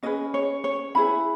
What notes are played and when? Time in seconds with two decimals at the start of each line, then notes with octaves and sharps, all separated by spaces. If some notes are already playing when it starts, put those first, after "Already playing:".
0.03 C#4 E4 G#4 B4 D#5
0.34 C#5
0.64 C#5
0.95 C#4 E4 G#4 B4 B5